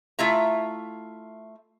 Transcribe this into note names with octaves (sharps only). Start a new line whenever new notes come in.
A3 E4 F4 E5 A#5